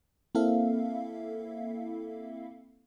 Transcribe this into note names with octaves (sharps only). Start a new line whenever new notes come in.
A#3 C4 E4 A4 E5 F5